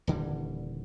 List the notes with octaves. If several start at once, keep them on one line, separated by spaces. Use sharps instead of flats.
D#1 D3 E3 G3